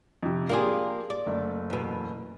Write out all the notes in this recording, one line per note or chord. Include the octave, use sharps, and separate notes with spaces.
F2 C3
A#3 D4 F4 G4 G#4 F5
D5
F#1 A3
E2 B2